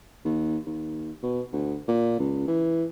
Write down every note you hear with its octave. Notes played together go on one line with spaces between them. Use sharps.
D#2
D#2
B2
D2
A#2
C#2
E3